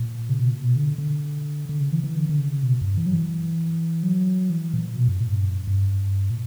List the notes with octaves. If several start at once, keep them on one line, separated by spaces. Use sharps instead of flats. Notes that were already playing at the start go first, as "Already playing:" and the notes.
Already playing: A#2
C#3
B2
A#2
B2
D3
D3
D3
C#3
E3
E3
D3
D3
C#3
B2
F#2
G2
E3
F#3
E3
F#3
E3
A#2
B2
F#2
A#2
G2
F#2
G2
A#2